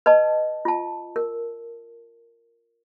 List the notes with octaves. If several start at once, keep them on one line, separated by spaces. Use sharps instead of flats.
B4 D#5 A5
F4 A5
A#4